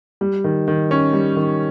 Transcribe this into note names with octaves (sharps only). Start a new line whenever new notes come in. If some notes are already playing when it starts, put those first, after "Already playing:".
G3
D#3
D#3
C#4
G3
D#3